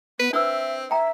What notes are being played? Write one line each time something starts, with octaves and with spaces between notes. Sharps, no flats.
B3 B4
C4 D4 B4 E5 E6
E5 G5 A#5